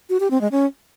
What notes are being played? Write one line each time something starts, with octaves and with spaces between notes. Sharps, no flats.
F#4
G4
C4
G#3
C#4